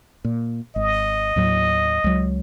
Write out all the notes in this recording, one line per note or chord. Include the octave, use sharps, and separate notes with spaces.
A#2
G#1 D#5
D#2 A2 F#3
C#2 F#3